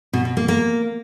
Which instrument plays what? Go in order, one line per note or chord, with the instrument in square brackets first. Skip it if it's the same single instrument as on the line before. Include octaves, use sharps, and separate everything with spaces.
[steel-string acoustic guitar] B2
B2
A#3
A#3